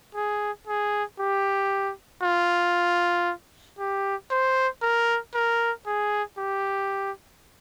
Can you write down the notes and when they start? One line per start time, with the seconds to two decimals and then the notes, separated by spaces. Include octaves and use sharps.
0.15 G#4
0.67 G#4
1.19 G4
2.23 F4
3.79 G4
4.31 C5
4.83 A#4
5.35 A#4
5.86 G#4
6.38 G4